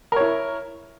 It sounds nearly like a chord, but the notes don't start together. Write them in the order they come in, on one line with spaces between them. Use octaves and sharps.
A#4 C#5 E4